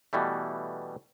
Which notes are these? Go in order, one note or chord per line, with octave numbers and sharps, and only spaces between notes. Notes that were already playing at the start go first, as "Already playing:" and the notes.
B2 E3 G3 A3